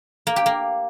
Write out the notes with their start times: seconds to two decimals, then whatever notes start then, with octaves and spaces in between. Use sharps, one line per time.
0.27 A#3
0.36 G4
0.46 A#3